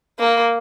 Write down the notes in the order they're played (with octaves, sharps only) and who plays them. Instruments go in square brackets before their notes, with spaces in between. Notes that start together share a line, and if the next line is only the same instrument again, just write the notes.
[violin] A#3